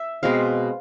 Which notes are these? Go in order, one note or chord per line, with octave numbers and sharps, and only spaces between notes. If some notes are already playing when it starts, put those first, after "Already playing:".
Already playing: E5
B2 G#3 C4 F5